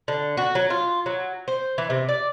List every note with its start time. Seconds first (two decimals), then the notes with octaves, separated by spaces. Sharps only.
0.08 D3
0.37 F#4
0.55 F#3
0.70 F4
1.06 F#3
1.48 C5
1.78 E3
1.90 C3
2.09 D5